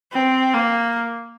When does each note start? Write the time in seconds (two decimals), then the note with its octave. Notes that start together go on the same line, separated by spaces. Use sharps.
0.12 C4
0.54 A#3